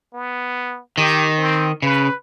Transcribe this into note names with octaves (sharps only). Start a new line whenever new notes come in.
B3
D#3 G4
C4
C#3 B4